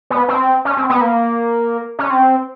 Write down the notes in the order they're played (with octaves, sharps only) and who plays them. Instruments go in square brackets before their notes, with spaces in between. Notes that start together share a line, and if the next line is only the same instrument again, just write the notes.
[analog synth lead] B3
C4
C#4
C4
B3
A#3
C#4
C4